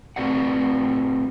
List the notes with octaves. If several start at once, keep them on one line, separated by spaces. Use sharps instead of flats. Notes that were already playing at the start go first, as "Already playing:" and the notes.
A3 C4 F#4 B4 D5 F#5